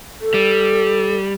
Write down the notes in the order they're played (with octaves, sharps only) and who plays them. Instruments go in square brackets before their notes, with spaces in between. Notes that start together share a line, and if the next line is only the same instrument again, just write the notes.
[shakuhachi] A4
[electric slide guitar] G3